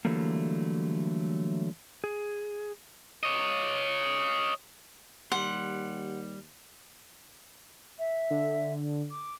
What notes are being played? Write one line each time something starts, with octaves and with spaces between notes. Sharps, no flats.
D3 E3 F#3 G3 A3 A#3
G#4
C#5 D#5
D#2 G3 F#5 C6
E5
D3
D6